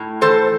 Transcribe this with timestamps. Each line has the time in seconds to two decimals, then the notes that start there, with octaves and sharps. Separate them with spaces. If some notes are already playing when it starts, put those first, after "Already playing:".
Already playing: A2
0.21 E3 A4 C5